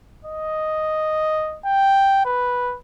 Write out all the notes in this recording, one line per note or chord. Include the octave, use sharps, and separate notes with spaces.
D#5
G5
B4